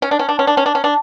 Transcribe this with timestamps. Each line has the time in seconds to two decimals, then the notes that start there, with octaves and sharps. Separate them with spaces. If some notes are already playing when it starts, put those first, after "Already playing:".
0.02 C#4
0.11 D4
0.19 C#4
0.29 D4
0.39 C#4
0.47 D4
0.57 C#4
0.66 D4
0.75 C#4
0.84 D4